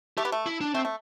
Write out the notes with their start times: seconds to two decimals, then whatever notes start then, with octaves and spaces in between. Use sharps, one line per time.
0.17 A3 G4
0.25 B3
0.32 A3
0.46 E4
0.61 D4
0.74 A3 C4
0.85 A3